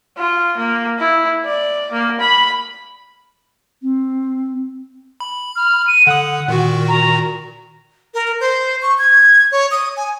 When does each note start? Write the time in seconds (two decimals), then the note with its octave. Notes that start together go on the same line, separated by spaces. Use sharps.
0.17 F4
0.57 A#3
0.99 E4
1.45 D5
1.92 A#3
2.20 B5
3.82 C4
5.20 B5
5.56 F6
5.87 D#7
6.07 D3 F#5 D#6
6.48 A#2 D#3 F#4
6.88 A#5
8.14 A#4
8.40 C5
8.82 C#6
8.99 G#6
9.52 C#5
9.71 D#6
9.97 G#5